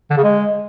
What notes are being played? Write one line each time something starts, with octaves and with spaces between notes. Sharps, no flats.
D3
C#3
G#3